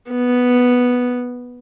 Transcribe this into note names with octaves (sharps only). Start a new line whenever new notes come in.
B3